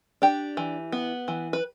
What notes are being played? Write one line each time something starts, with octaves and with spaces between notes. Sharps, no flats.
D4 G4
E3
B3
E3
B4